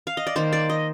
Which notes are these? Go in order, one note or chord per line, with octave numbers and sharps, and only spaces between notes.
F5
D#5
D5
D#3 A#3 C5
D5
D#5